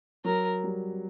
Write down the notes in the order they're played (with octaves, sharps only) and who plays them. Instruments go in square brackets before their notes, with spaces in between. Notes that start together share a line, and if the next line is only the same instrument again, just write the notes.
[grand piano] F#3 [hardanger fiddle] A#4
[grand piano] G3